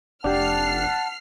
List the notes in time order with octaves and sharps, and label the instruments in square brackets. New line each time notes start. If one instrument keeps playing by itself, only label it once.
[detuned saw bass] F1 [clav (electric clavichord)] D4 G4 [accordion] F#5 A5 [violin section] F6 C7